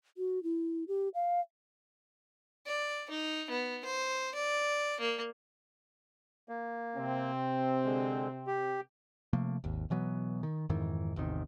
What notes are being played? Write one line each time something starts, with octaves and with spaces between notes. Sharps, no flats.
F#4
E4
G4
F5
D5
D#4
B3
C5
D5
A#3
A#3
C3 C4
D3 G#3
G4
C3 F3 A3 A#3
G#1 D#2
B2 E3 F#3 B3
D#3
F2 G#2 D#3 E3
A1 E2 C3 D#3